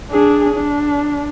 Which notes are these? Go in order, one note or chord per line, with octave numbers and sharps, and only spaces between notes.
D4 G#4
D4